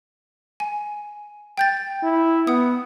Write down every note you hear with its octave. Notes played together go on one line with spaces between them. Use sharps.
G#5
G5 G6 A6
E4
B3 F#5 D#6